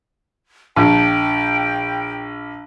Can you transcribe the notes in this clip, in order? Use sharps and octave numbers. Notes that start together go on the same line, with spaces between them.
A#1 G5